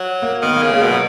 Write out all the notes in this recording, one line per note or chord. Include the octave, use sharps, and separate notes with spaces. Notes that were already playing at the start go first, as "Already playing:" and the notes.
Already playing: F#3
A#3
D#3 B3
A#3
C#3
G#3
B2 F#3